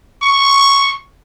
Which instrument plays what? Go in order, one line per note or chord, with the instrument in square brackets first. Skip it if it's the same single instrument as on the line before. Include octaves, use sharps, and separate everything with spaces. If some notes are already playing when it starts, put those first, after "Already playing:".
[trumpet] C#6